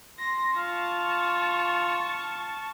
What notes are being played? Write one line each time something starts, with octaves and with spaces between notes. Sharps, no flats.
C6 A#6
F4 A5 C#6